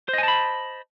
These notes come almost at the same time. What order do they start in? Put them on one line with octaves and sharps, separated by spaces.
C5 D#5 G#5 A5 B5